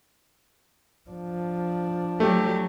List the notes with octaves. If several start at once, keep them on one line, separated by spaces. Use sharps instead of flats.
F3 D4
F#3 A3 G4